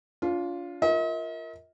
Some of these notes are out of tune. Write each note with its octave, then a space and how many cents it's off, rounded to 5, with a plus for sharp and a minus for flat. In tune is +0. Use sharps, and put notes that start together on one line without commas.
D4 -40 F4 +0
F4 +0 A#4 +0 D#5 +45